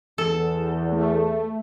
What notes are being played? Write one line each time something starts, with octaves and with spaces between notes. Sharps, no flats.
E2 A4
A3